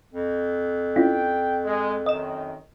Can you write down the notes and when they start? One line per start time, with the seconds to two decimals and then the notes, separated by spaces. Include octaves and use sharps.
0.13 F2
0.96 C#4 E4 F4 G5
1.64 G#3
2.06 F#2 D#3 D#5 E7